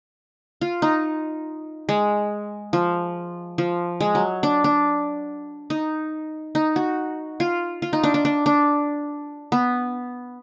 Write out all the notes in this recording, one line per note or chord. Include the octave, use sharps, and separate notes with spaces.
F4
D#4
G#3
F3
F3
G#3
F#3
D4
D4
D#4
D#4
F#4
F4
F4
D#4
D4
D4
D4
D4
B3